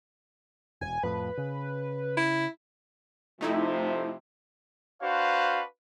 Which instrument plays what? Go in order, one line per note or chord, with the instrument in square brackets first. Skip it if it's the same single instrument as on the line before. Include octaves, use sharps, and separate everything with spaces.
[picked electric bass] E1 [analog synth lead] G#5
[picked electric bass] F2 A2 [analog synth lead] B4
[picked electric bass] C#3
[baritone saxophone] E4
[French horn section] C3 F3 [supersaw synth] A3 D#4 E4
[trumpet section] D4 F#4 B4 C5 F5